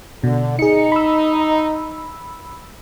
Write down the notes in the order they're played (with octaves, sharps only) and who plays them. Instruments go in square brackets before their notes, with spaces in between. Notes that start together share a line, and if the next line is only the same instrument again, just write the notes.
[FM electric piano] B2 [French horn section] D3
[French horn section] D#4 [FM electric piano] G#4 C#7
[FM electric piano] B5 E6